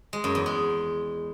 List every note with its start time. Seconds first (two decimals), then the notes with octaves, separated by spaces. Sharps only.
0.13 G#3
0.24 F#2
0.35 E2
0.46 G#3